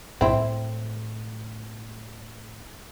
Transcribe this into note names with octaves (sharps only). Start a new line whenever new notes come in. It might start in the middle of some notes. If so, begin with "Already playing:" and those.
A2 C4 E4